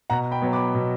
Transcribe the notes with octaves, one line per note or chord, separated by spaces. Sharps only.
B2 F#5 A#5
G5 B5
F#3 B3
B5 D6
B2